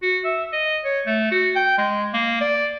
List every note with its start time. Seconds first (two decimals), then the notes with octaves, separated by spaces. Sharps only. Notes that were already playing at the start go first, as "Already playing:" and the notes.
0.02 F#4
0.24 E5
0.52 D#5
0.85 C#5
1.06 A3
1.31 F#4
1.55 G5
1.78 G#3
2.13 A#3
2.41 D5